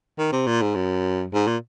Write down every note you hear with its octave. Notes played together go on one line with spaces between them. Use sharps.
D#3
C3
A#2
G#2
F#2
G#2
A#2